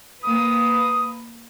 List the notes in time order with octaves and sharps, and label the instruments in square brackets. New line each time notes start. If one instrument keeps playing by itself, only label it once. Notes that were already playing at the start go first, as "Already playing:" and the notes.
[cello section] A#3 B4 [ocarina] D#6